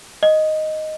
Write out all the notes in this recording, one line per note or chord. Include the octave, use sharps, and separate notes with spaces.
D#5